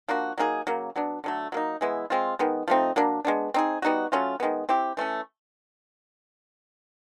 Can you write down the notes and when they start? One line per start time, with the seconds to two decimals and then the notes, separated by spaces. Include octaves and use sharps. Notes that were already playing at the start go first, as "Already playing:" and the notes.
0.08 F3 A#3 D4 F#4
0.38 F#3 A#3 D#4 G#4
0.67 C#3 F#3 A#3
0.96 F#3 B3 D4
1.24 D3 F#3 A3
1.52 F#3 A#3 D#4
1.81 E3 G#3 B3 E4
2.10 G#3 C4 F4
2.39 D#3 G#3 B3
2.68 F3 A3 C4 D#4
2.96 F#3 A#3 D4
3.25 G#3 B3 D4
3.54 C4 D#4 G#4
3.82 G3 B3 D#4 F#4
4.12 F#3 A3 C#4 F4
4.40 D#3 G#3 B3
4.69 C4 E4 G4
4.97 E3 A3 C#4